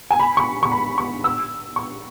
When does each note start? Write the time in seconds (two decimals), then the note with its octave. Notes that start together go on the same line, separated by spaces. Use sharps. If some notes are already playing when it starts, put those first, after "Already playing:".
0.11 G#5
0.20 B5
0.37 C#6
0.63 C#6
0.72 B5
0.98 C#6
1.24 E6
1.76 C#6